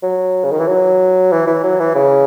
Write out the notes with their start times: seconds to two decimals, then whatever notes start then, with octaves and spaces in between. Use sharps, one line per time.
0.03 F#3
0.44 C#3
0.52 D#3
0.60 E3
0.67 F#3
1.32 E3
1.47 E3
1.63 F#3
1.80 E3
1.95 C#3